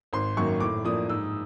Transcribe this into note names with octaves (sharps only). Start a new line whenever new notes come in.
G#1 C6
F#2 D#3 F#3 A#3 C#6
A2 D6
F3 A#3 D4 D#6
G#2 E6